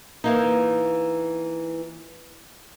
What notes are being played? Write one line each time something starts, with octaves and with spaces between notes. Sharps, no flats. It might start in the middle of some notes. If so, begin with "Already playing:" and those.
E3 A#3 D#4